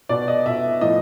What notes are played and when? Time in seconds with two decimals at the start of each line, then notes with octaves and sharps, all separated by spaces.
0.09 B2 D5
0.28 D#5
0.46 B2 E5
0.81 A2 F3 D#5